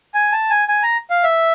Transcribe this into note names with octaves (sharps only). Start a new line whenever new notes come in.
G#5
A5
G#5
G#5
A#5
F5
E5